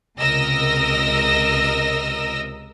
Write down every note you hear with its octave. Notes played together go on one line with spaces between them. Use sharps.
C#2 C3 A#4 D#5 E6 A#6